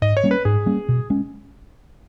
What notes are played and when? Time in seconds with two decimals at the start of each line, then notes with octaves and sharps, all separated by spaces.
0.02 G#2 D#5
0.17 C#5
0.24 G3 A#3 C#4
0.31 B4
0.45 G#2 G#4
0.66 G3 A#3 C#4
0.89 B2
1.10 G#3 C#4